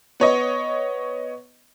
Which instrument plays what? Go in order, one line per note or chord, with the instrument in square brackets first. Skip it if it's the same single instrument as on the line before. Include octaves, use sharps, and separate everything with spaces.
[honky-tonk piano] B3 C#5 D#5 C#6